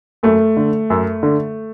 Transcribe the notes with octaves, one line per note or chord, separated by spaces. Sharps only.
F#2 A3
D3
F#2
D3